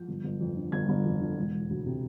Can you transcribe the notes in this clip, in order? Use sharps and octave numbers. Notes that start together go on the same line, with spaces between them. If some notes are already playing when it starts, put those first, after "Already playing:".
Already playing: F3 G6
G1
G1
F2
D3
G1 G#6
G1
F2
D3
E1
E1
D2
C3